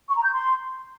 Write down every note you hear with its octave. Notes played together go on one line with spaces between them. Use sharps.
C#6
A#5
G6
C6